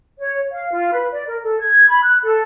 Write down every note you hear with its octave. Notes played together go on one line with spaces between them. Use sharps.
C#5
F5
F4
B4
D5
A#4
A4
G#6
B5
F#6
A4